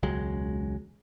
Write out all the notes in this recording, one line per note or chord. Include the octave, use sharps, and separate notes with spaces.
E1 C#2 F#3 G#3